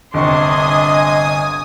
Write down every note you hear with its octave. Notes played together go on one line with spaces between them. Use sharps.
G1 C3 D4 D#5 G#5 C6 C#6 D#6